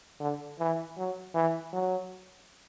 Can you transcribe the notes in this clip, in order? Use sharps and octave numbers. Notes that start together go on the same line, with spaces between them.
D3
E3
F#3
E3
F#3